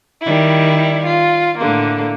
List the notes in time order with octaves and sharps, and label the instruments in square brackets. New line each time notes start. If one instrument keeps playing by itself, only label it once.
[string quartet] D#3 G3 E4
F4
A2 D3 A#3